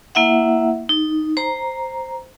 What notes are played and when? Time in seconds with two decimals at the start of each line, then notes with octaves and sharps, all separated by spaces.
0.15 A#3 E4 E5 F#5
0.89 D#4
1.37 C5 A#5